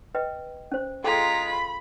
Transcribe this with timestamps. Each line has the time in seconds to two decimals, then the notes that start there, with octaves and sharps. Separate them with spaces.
0.15 B4 D#5 G5
0.72 C#4 C5
1.04 G#3 F4 G#4 A4 G5 A#5 B6
1.49 B5